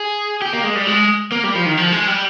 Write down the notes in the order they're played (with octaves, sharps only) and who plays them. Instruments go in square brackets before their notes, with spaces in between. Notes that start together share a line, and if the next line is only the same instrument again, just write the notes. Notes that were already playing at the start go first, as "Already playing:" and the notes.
Already playing: [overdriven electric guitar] G#4
G4
A#3
G#3
G3
G#3
A#3
G3
F3
D#3
F3
G#3
G3